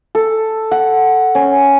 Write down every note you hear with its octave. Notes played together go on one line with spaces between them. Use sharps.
A4
F#5
C#4